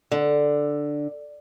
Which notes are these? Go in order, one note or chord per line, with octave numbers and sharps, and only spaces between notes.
D3